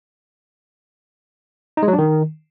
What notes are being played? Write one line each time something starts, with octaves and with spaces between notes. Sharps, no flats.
D#4
G#3
F#3
D4
D#3